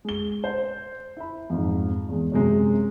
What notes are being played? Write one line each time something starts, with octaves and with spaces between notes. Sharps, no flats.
G#3 G7
C5
E4 B5
F2 G#2
E2 G#3
F#2 C3 G#3